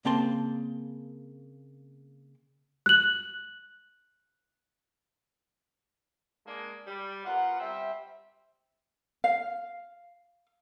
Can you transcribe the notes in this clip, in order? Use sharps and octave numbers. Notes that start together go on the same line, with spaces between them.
C#3 A#3 C4 A5 C6
F#6 F#7
G#3 A#3 D4
G3 D5
B3 F4 A#4 F#5
G3 C4 E5
F5